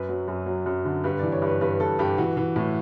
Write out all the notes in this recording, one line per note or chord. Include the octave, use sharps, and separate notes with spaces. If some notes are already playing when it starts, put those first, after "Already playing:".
Already playing: F#2 B4
F#3
F#2
F#3
F#2
D3
G2 B4
E3 D5
C#5
G2
B4
G2 B4
G2 A4
G2 G4
E3 F#4
E3
A2